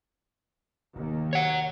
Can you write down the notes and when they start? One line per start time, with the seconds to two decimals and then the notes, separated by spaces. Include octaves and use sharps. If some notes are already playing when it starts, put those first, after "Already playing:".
0.96 F1 D#2
1.33 C#5 F#5